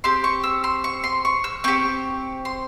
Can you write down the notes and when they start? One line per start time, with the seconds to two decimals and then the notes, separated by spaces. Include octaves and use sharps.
0.04 C4 G4 C6
0.24 C#6
0.44 E6
0.64 C6
0.84 C#6
1.04 C6
1.25 C#6
1.44 E6
1.64 C4 G4 C#6
2.45 C6